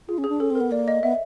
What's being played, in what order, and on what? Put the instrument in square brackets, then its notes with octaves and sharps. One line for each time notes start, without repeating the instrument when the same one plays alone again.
[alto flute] F4 [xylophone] G#4
[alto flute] C#4
[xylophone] G#4
[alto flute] D4
[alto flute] C#4 [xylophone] A4
[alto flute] C4
[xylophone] A#4
[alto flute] B3
[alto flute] A#3 [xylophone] D5
[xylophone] D#5
[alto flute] B3 [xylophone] E5